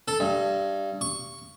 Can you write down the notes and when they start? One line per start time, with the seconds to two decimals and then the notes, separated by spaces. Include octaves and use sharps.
0.08 A4
0.20 G2
1.01 C#6